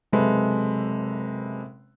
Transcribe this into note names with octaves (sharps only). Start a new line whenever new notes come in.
F#1 C3 G#3 A4 B4 E5